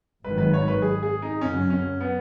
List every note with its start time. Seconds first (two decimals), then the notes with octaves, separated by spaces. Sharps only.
0.24 G#1 G#2 D#3 F#3 B4
0.38 B4
0.53 C#5
0.68 B4
0.82 G#4
1.03 G#4
1.22 D#4
1.41 F#2 C#3 F#3 C#4
1.70 C#4
2.01 B3